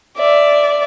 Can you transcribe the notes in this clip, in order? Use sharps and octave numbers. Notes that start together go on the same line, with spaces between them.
D5 E5